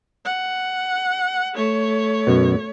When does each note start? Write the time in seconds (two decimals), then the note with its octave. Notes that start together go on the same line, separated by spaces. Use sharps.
0.25 F#5
1.54 A3 C#5
2.27 F#2 B2